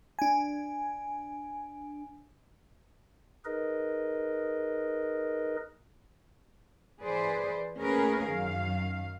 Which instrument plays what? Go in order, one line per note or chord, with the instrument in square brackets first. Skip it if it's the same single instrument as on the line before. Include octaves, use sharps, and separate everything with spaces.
[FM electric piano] D4 G#5
[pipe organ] D#4 G#4 A#4 B4 D#5
[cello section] E3 G#4 B4 C5 D5
A3 A#3 C#4 G#4 A#4 B4
F#2 D#3 F5